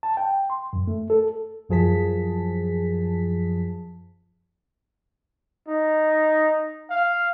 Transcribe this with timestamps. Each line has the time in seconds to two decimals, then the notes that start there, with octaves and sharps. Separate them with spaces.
0.03 A5
0.17 G5
0.50 C6
0.73 F#2
0.88 A3
1.10 A4
1.69 F#2 F3 G#4 A5 B6
5.68 D#4
6.90 F5